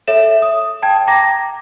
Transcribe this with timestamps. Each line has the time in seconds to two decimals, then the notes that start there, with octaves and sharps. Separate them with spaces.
0.08 A4 C#5 E5 E7
0.42 D#6
0.82 G5 A5 G#6
1.07 G5 A#5 D6 A#6